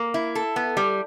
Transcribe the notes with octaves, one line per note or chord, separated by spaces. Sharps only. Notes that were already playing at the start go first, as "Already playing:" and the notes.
Already playing: A#3
E4
A4
B3
G3